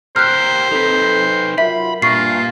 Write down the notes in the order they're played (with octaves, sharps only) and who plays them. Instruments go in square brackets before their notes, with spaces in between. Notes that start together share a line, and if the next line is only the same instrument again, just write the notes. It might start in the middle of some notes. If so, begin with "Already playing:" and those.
[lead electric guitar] G4 A#4 [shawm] C5 [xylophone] F6 F#6
[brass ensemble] C4 A4 [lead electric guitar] D#4 B4
[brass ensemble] F#3 F4 A#4 [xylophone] E5 [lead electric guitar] B5
[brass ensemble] G2 [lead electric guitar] A#2 [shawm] F4 [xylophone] C#6 C7